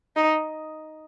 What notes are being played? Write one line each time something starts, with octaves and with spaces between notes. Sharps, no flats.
D#4